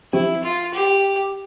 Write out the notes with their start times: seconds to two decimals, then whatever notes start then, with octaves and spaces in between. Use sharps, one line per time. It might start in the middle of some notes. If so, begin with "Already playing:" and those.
0.13 F3 C4 E4 G4
0.44 F4
0.74 G4